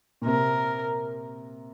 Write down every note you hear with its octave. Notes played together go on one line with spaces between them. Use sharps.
A#2
C3 A#4